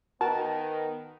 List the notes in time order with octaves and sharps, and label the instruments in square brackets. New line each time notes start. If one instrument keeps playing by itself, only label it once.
[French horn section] D#3 B3 [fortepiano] F#4 A#4 [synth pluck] A5